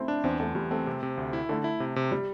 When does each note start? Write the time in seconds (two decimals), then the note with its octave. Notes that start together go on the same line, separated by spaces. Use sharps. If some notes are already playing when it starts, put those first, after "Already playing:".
Already playing: A3 C4 E4
0.08 D4
0.24 E2 C4
0.39 E2 A3
0.55 E2 G3
0.71 A3 C4
0.87 C3
1.03 C3
1.17 D2
1.33 E4
1.49 D3 A3
1.64 E4
1.80 C3
1.96 C3
2.12 G3